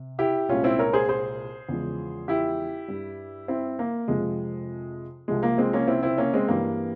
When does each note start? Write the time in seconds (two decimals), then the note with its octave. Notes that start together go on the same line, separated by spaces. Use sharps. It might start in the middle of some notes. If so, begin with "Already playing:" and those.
Already playing: C3
0.19 E4 G4
0.49 C2 A#2 G#3 C#4 F4
0.64 C4 E4
0.79 A#4 C#5
0.93 G#4 C5
1.09 G#4 C5
1.69 E2 C#3 F3 G#3
2.28 E4 G4
2.88 G2 G3
3.48 C4 E4
3.79 A#3
4.08 F2 C3 F3 G#3
5.28 C2 C3 F3 G#3
5.43 A#3
5.58 G#3 C4
5.73 A#3 C#4
5.88 C4 E4
6.03 C4 E4
6.18 A#3 C#4
6.34 G#3 C4
6.48 G2 E3 G3 A#3